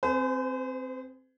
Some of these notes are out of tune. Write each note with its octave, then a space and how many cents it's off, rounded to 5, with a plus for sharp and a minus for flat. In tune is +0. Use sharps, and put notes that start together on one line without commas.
C4 +0 G#4 +10 C5 -45